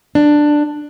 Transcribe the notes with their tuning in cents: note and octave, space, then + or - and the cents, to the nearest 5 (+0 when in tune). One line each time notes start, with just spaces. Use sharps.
D4 +10